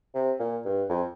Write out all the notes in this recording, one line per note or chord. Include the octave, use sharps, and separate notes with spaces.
C3
A#2
G2
F2